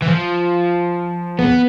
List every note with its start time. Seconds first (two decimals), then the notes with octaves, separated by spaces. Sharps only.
0.02 E3
0.08 F3
1.39 B3